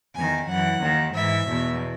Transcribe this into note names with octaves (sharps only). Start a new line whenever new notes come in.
E2 D#3 G#5
F#2 E3 F#5
D#2 D#3
G#2 E3 E5
E2 B2